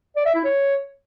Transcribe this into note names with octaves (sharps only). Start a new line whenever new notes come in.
D5
E5
E4
C#5